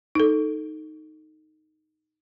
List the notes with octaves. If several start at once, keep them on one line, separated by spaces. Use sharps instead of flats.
D#4 A4